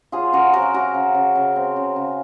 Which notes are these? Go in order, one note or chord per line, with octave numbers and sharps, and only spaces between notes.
F#3 F4 G#4
C#3 F#4 A#4
C4 F#4 A#4
F#3 F#4 A#4
C#3
C#3
C#3
C4
C#3
C#3